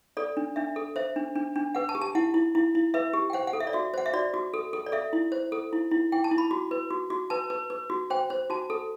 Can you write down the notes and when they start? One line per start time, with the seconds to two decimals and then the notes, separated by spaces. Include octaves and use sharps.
0.17 A4 D5
0.37 D4
0.56 D4 E5
0.76 A4
0.96 C5 E5
1.16 D4
1.36 D4
1.56 D4
1.75 B4 F#5
1.89 A5
1.95 G4
2.01 A5
2.15 E4 F#5
2.34 E4
2.55 E4
2.75 E4
2.94 B4 E5
3.13 G4
3.30 G5
3.33 C5 F#5
3.47 F#5
3.53 A4
3.60 E5
3.67 D5
3.73 F#4 E5
3.94 C5 F#5
4.06 E5
4.13 F#4 D5
4.34 F#4
4.54 A4
4.73 A4
4.86 D5
4.92 A4 E5
5.13 E4
5.32 C5
5.52 A4
5.73 E4
5.91 E4
6.12 E4 G5
6.24 A5
6.31 E4
6.38 B5
6.51 F#4
6.71 B4
6.90 F#4
7.10 F#4
7.30 B4 A5
7.50 B4
7.70 B4
7.90 F#4
8.10 C5 G5
8.30 C5
8.50 F#4 A5
8.70 A4